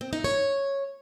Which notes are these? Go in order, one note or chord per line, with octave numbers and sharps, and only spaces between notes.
C4
D#4
C#5